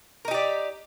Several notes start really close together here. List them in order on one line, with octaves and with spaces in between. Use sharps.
A#4 D#4 G4 D5